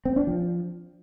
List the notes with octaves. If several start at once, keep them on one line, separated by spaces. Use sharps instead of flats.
C4
D4
F3